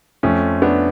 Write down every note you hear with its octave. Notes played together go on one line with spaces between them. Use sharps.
F2 F3 A3 C#4
B3 D4